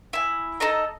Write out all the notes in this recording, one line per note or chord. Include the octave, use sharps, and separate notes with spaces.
E4 G#5
D#4 A4 D#5 A#5